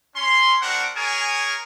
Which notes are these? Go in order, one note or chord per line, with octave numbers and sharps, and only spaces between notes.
C#4 C6
C4 D4 F#4 A#4 F#5
G#4 A#4 C#5 G#5